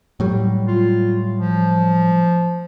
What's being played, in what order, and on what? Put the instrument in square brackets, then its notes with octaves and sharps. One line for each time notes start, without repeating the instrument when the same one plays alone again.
[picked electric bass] A2 F#3 G3
[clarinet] F4
F3